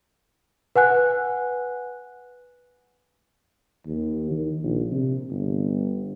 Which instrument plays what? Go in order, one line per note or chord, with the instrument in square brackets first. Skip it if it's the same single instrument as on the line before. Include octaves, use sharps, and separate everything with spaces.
[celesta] B4 F#5 G#5 F#6
[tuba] D#2
D#3
A#1
C3
G1